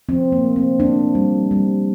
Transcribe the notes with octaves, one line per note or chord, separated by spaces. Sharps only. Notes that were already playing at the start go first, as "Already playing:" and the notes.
F3 C4
A#3
A3
C4
A#3 D4
G3
G3